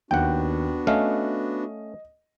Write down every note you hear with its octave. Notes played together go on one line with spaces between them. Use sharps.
D#2 B3 D4 F#4 F#5 G5
A3 C#4 D#5 F5